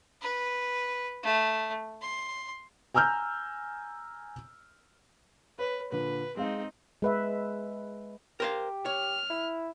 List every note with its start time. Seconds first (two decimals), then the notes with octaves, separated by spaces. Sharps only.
0.21 B4
1.23 A3
2.02 C6
2.95 G#5 A#5 E6 F6 G6
5.59 B4 C#5
5.92 A#2 D3 B4
6.37 G#3 C4 D#4 F5
7.02 G#3 B4 E5
8.40 G4 A#4 C5 F5
8.86 C#5 F6
9.30 E4